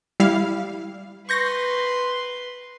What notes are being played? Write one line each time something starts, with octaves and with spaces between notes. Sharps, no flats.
G3 E4 F5
B4 C6 C#6 G6 A#6